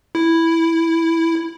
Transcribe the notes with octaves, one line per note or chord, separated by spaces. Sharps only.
E4